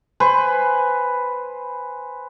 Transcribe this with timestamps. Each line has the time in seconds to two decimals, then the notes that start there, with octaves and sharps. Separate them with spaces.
0.20 B4 C5 G#5